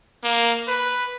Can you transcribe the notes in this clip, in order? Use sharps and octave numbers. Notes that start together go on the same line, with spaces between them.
A#3
B4